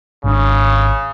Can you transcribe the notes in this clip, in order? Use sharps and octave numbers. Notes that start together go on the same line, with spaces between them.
G#1 C#3 D4